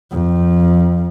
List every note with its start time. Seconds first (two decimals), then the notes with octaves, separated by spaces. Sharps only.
0.12 F2